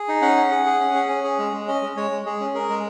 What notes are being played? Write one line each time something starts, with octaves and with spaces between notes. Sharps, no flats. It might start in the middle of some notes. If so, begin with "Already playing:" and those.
Already playing: G#4
D#4
C#4 F#5
G#4
G#4
G#4
C#4
G#4
C#4
G#4
G#3
G#3
C#4 D#5
G#3
G#3 C#5
G#3
G#3 G#4
C#4
G#4 A#4
G#3